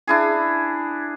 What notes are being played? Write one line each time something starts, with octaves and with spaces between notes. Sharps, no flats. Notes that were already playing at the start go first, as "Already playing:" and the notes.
D4 E4 G#4